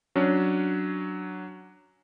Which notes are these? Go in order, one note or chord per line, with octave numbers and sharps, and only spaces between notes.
F#3 C#4 D4